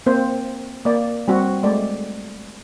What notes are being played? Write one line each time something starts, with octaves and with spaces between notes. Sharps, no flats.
A#3 C4 C5
A#3 D5
G3 C4 F#4
G#3 A3 D5